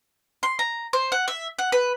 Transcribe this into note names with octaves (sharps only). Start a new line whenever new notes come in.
C6
A#5
C5
F#5
E5
F#5
B4